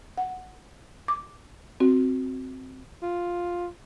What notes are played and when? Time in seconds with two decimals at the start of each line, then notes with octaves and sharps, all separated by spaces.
0.18 F#5
1.08 D6
1.80 C4 F#4
3.03 F4